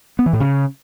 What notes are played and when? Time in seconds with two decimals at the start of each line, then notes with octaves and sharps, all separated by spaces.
0.19 B3
0.26 E3
0.33 A2
0.40 C#3